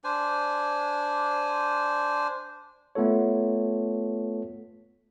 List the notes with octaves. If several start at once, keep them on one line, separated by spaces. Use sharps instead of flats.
D4 C5 G#5
A3 B3 F4 A4 C#5